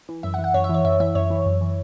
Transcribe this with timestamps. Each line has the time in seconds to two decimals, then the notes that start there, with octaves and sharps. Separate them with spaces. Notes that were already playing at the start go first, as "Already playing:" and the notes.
0.09 E3
0.23 F#2 E5
0.34 F#5
0.38 E3
0.44 F#5
0.54 F#2 C#5
0.64 E5
0.69 E3 C#5
0.84 F#2 E5
1.00 E3 E5
1.15 F#2 C#5
1.30 E3
1.46 F#2
1.61 E3